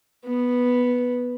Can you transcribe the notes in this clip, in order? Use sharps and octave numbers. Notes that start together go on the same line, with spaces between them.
B3